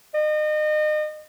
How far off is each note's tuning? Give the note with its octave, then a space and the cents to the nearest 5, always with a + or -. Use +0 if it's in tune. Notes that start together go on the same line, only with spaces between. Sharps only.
D#5 -35